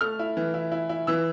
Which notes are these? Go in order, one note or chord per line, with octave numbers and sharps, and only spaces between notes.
A3 F6
E4
E3
E4
E4
E4
E3 E6